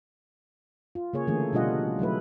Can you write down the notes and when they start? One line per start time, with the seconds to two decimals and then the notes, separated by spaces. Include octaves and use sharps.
0.95 F4
1.13 C#3 A#3 G#4 C#5
1.27 D3 E3 A3 A#3 G#4
1.53 B2 G3 D4 F4 D#5 F#5
1.99 F#3 A3 E4 B4